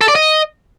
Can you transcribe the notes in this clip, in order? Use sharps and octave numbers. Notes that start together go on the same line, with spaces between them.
A4
D5
D#5